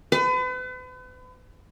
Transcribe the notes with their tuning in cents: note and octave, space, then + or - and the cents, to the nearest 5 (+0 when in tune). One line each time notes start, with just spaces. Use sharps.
B4 +40